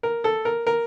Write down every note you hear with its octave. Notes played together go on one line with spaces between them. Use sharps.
A#4
A4
A#4
A#4